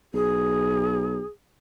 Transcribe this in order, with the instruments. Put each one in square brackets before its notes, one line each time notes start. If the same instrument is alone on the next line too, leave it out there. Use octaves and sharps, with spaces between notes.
[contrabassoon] B1 [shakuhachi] G#4